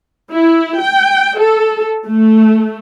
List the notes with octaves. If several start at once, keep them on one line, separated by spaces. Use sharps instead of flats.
E4
G5
A4
A3